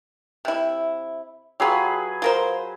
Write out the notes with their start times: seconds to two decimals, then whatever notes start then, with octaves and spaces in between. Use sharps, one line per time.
0.45 C3 E4
1.60 F#3 F4 G4 G#4 B4
2.22 F4 A#4 C5